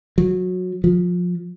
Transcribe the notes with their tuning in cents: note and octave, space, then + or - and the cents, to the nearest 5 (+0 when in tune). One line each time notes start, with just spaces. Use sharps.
F#3 -20
F3 +25